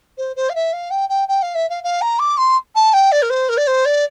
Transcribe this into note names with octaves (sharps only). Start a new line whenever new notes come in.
C5
C5
F5
E5
F5
G5
G5
G5
F5
E5
F5
F5
A#5
D6
C6
A5
G5
D5
A#4
C5
A#4
D5
C5
D5